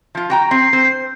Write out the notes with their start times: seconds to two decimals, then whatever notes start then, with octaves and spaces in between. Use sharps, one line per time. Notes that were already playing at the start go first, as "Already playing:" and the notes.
0.15 F3 F4
0.30 F#4 G5 A#5
0.51 C4 C7
0.73 C4 C5